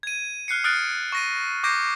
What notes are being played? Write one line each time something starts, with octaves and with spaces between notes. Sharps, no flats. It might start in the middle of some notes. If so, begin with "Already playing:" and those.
G#6 D#7
F6 F#6 C7 C#7
D#6 F6 F#6 A6 D7
C#6 A#6 D#7
C#6 D6 G6 A#6 C7 D7